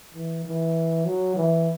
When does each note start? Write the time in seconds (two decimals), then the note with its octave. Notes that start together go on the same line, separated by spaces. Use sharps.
0.15 E3
0.45 E3
1.05 F#3
1.36 E3